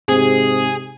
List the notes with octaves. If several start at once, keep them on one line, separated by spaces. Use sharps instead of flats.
G#2 C3 G#4